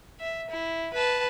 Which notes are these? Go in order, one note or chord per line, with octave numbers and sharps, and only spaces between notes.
E5
E4
B4 A5